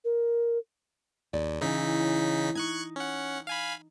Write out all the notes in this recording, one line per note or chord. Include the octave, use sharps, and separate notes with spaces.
A#4
D#2 D5
C#3 E3 C#4 D#4 B6
D#4 C#6 F#6 G#6
C#4 F#5
F5 G#5 B5